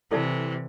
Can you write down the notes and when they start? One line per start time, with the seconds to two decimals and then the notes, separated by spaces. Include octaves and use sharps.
0.11 C3 E3 E4 A4 D5 A5